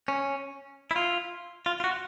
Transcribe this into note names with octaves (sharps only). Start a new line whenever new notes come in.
C#4
E4
F4
F4
F4
F#4